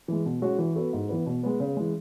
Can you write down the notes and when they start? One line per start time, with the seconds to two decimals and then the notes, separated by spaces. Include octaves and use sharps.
0.08 E3 G#3
0.26 B2
0.42 G#3 C#4 F#4
0.59 E3
0.76 B3 F#4 A4
0.93 G#2
1.09 E3 B3
1.26 B2
1.43 G#3 B3
1.60 C#3
1.77 E3 G#3